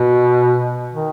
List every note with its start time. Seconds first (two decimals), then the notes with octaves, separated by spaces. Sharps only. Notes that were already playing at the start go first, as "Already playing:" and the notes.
Already playing: B2
0.94 D#3